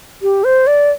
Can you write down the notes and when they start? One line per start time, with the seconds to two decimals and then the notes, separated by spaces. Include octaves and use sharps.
0.22 G4
0.44 C5
0.67 D5